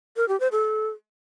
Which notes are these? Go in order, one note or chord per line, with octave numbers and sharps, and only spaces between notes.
A#4
G4
C5
A4